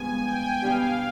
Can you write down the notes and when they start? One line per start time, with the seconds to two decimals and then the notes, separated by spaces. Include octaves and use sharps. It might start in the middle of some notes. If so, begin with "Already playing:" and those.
Already playing: D2 G2 F3 G#3 B3 G#5
0.21 G5
0.62 B2 G3 D4 G4 F5